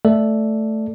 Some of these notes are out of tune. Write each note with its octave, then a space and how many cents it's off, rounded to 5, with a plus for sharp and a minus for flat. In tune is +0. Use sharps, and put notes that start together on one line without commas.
A3 +0 A4 +0 D5 +0